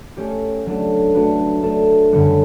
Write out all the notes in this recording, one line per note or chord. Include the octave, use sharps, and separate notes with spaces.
A3 C#4 G4
F#3 A3 D4 A4
A3 D4 F#4 B4
A3 D4 A4
F#2 D3 G3 B3 F#4